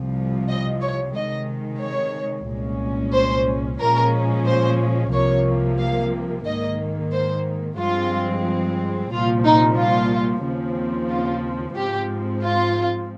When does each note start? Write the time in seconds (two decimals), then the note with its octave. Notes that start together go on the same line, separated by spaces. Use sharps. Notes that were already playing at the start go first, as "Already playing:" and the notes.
Already playing: C2 C3 F3
0.49 D#5
0.81 C#5
1.14 C3 D#3 G#3 D#5
1.81 C#5
2.48 C2 A#2 G#3 C#4
3.14 C5
3.80 A#2 F3 G#3 C#4 A#4
4.46 C5
5.13 C2 C3 F3 A#3 C#5
5.79 F5
6.45 G#2 D#3 A#3 D#5
7.12 C5
7.78 G2 F3 G#3 C4 F4
9.11 C2 A#2 F3 F4
9.44 D#4
9.78 F4
10.44 D#2 C#3 F3 C4
11.09 F4
11.76 G#2 F3 C4 G4
12.43 F4